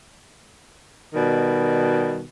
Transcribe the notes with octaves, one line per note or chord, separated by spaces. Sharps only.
B2 D#3 G3